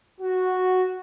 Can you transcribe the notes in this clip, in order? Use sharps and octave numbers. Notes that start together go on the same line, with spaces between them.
F#4